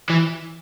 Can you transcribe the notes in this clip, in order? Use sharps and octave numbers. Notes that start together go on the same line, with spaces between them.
E3